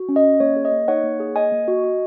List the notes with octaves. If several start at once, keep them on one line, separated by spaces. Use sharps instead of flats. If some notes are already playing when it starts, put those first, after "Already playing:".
Already playing: F#4
C#4
D#5
C#4
A#3 C#5
G#4
D#5
A#3
D#4 C#5 F#5
A#3
G#4
A#3 D#5 G#5
A#3
F#4
F#4